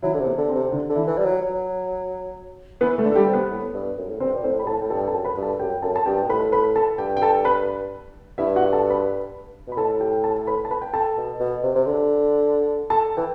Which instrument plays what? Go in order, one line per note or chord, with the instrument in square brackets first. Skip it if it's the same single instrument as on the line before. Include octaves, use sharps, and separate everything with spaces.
[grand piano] E3 E4 [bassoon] F#3
[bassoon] D3
C3
[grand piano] B3
[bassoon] D3
[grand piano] C4
[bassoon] C3
[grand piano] D3 D4
[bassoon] D3
[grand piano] E3 E4
[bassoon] E3
G3
F#3
F#3
[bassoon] E3 [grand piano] B3 B4
[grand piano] A3 A4
[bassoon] D3
[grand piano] A4
G3 G4
[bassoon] C3
[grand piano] B3 B4
[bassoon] A2
G2
F#2
A2
[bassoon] G2 [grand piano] C4 C5
[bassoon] B2 [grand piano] D5
[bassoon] A2 [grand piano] C4 C5
[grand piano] B5
[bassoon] G2
[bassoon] A2 [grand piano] A4 A5
[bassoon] A2 [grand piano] G5
[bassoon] G2 [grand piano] A4 A5
[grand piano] G5
A4 A5
[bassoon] F#2
[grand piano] B4 B5
[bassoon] G2
[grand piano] A4 A5
[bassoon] F#2 [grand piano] G4 G5
[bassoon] F#2 [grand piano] A4 A5
[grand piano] A5
[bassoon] G2 [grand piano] G4 G5
[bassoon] B2
[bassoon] A2 [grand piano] B4 B5
[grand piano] B4 B5
A4 A5
[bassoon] G2 [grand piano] G4 G5
[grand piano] G5
A4 A5
B4 B5
[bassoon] G2 [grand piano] E4 E5
[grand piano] F#4 F#5
A4 A5
B4 B5
[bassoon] B2 [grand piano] B5
[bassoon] A2 [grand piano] A4 A5
[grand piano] G4 G5
A4 A5
B4 B5
A5
B4 B5
G5
A4 A5
[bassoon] B2
B2
C3
C3
D3
[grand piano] A4 A5
[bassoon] E3 [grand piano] G5